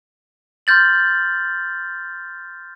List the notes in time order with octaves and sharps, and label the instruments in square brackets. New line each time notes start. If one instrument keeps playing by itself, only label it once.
[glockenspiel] C6 F6 G6 A6 F#7